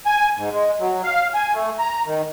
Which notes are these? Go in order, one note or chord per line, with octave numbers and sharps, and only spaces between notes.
G#5
G#2
G#3
F#3
F5
G#5
A3
A#5
D#3